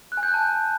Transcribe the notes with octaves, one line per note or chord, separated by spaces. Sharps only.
F#6
G#5
G6
F#6
A5